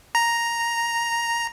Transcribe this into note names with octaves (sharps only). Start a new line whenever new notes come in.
A#5